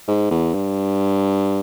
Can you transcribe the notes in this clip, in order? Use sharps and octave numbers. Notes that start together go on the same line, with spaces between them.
G#2
E2
G2